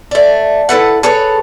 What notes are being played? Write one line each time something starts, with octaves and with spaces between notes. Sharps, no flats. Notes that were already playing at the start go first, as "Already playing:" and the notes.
A3 D5
E4 A4 B4 F#5
G#4 A4 B4 C#5